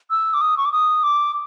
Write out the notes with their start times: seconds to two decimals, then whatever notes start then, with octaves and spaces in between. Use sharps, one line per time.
0.10 E6
0.34 D6
0.41 D#6
0.57 C#6
0.65 D6
0.72 D#6
1.03 D6